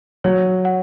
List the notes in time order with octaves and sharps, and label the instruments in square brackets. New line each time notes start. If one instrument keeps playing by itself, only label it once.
[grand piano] F#3 [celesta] C#5
[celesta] F#5